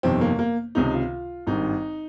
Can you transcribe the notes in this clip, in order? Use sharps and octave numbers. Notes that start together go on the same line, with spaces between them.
G1 F2 C3 D#3 C4
A#3
A#3
C#2 C3 D#3 D#4
F4
G#1 G2 D#3 D#4